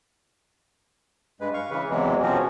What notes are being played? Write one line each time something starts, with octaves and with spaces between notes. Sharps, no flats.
G2 G#3 B4
F5 C#6
C#3 E3 B4
E2 C3 E3 F#3 G#3
B2 F3 C4 C#4 F#4